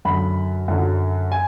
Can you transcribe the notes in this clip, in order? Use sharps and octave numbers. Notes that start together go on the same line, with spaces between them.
F#2 D3 F#3 B5
F#2 D3 F#3
G#5